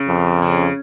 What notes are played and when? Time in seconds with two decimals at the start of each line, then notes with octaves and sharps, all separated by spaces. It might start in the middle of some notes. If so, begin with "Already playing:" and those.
Already playing: C#3
0.08 F2
0.42 C#3